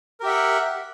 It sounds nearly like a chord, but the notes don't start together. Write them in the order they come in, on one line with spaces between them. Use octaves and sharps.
A#4 G4 E5 F#5